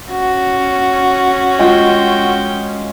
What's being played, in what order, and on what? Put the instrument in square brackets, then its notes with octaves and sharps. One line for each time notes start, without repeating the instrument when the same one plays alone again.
[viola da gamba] C#4 [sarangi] F#4
[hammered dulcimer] G#3 F4 [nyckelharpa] G5